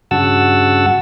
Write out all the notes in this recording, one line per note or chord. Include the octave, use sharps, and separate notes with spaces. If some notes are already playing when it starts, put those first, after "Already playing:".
G2 C#3 F#4 F#5 A5 E6